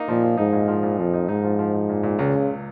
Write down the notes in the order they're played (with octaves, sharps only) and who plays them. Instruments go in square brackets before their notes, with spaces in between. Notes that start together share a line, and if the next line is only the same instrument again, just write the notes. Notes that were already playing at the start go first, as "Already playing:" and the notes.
Already playing: [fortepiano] A#3 D#4
[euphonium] A#2 [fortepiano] F3
[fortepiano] F3
[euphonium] G#2 [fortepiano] D#4
[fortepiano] A#2
F3
A#2
[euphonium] F2 [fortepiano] F3
[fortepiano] D#4
[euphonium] G#2 [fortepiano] D#4
[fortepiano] F3
F3
F3
A#2
A#2
[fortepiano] C#2 [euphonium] C#3
[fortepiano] C#2